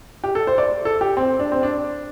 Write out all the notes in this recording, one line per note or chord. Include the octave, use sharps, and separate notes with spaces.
G4
A4
C5
D5
A4
G4
C4
D4
C4
D4